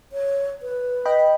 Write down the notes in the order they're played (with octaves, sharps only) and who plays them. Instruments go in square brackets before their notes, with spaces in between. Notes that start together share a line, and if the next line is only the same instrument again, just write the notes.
[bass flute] C#5
B4
[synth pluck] D#5 G5 B5